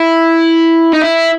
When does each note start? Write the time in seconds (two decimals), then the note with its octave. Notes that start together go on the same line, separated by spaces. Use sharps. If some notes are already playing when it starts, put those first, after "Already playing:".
Already playing: E4
0.93 D#4
1.02 E4